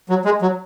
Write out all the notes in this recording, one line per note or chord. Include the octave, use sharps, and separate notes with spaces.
F#3
G#3
F#3